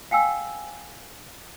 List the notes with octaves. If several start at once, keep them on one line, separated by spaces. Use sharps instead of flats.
F5 G5 G#5 E6